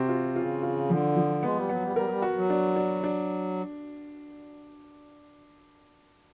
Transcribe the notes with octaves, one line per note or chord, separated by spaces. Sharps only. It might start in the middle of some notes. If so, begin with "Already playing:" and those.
Already playing: C3 C4 F#4
F4
C#3 F4
F4
D3 F3
F3
G#3 B3
G3
F#3 B3
G3
G3 A#4
F#3
G3
F#4
F#3
D4
D4
D4